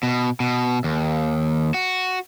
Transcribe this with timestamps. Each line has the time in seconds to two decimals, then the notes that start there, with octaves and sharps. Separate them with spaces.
0.03 B2
0.40 B2
0.84 D#2
1.74 F#4